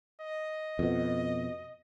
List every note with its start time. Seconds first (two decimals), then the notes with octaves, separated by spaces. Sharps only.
0.21 D#5
0.79 F2 B2